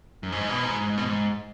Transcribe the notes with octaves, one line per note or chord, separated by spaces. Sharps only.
F#2
G#2
B2
G#2
G#2
B2
G#2